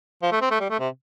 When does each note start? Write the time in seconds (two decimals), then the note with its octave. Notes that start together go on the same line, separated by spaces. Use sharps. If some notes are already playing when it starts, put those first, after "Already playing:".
0.23 F3
0.32 A3
0.42 C4
0.51 A3
0.60 G3
0.70 A3
0.80 C3